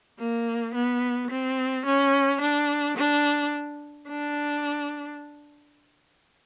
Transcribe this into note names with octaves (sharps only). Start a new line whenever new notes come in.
A#3
B3
C4
C#4
D4
D4
D4